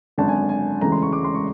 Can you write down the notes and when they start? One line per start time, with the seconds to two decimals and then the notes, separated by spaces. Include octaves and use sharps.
0.18 G#1 F#2 D3 A5
0.28 G#5
0.49 G#5
0.81 E1 D2 C#3 E3 G#3 A#5
0.92 C6
1.02 C#6
1.13 D6
1.24 C6
1.35 C#6